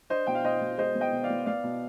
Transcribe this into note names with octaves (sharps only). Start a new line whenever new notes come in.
D4 C5 D#5
B2 G5
F5
B2 C5 D#5
B2
G#3 C5 D#5
B3
D#5 G5
B2
D5 F5
B3
B3 D5 F5
B2